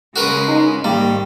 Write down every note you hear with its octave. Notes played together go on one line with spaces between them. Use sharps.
C#3 G#3 F#4 A#4 B4
D#4
G#2 D#3 G3 A#3